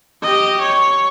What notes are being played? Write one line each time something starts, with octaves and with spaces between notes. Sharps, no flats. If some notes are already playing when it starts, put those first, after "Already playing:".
G4 D#5
C#5